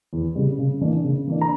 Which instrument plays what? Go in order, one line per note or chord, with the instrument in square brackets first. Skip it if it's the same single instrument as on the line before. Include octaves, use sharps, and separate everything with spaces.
[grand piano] E2
C#3 G3
C#3
E3 A#3 D4
C#3
E3 A#3 D4
A#5